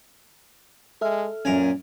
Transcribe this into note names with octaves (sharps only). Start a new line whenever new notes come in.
G#3 A4 E5 F6
F#2 A#2 C#4 A#4 G#5